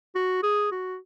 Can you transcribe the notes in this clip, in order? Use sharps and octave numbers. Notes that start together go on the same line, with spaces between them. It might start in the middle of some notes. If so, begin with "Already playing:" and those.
F#4
G#4
F#4